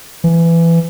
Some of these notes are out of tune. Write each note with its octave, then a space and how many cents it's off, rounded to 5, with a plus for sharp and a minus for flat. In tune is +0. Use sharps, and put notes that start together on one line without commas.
E3 +20